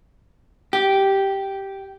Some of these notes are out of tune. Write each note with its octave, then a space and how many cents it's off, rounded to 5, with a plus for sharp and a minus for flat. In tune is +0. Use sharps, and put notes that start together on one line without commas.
G4 -5